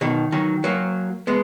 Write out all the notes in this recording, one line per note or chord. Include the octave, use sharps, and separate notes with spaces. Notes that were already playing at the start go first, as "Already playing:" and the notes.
B2 D#3
D#3 F#3
F#3 A#3
G#3 B3